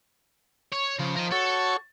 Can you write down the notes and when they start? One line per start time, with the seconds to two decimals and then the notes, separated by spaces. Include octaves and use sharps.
0.73 C#5
1.00 C#3 F3
1.17 A#4 D#5
1.32 F#4 A4 C#5 C#6